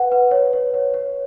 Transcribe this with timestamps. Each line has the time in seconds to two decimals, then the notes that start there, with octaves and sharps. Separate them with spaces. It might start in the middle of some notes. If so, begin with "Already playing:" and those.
Already playing: B4 F#5
0.12 B4
0.31 C#5
0.53 C#5
0.74 C#5
0.94 C#5